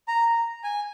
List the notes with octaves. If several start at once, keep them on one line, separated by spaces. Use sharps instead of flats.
A#5
G#5